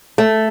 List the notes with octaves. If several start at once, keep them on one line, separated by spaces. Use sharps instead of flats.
A3